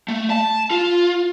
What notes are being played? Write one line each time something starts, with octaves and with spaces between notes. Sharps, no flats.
A3
A5
F4